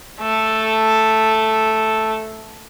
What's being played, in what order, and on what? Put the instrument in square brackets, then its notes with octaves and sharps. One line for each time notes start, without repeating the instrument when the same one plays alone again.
[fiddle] A3 A4